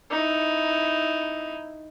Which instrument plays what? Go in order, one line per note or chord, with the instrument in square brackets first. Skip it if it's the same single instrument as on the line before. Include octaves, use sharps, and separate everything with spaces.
[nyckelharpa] D#4 E4